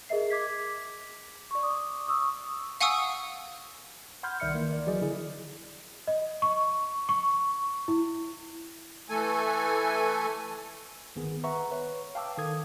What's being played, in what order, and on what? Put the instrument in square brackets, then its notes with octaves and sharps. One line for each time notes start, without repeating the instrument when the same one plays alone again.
[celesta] G#4 A#4 D#5 E5 C7
D6 G#6 B6
D5 C#6
D6 D#6
C#6 D#6 E6
[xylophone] F5 F#5 G#5 C#6 D#6 E6
[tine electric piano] F#5 B5 C6 F6 G6 G#6
C2 D#3 D5 E5 F6 C#7
D#3 E3 A#3
A#4 D5
E3 F#3 G#4 D5 D#5
D3 E4 G#4
[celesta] D#5
C#6
C#6
E4
[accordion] E3 A3 A4 G#5
[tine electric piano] G1 D#3 B3 G#4
B4 E5 F#5 A#5 C#6
B4 C#5
F5 G5 A5 D6 E6
D#3 A4 D#6 G#6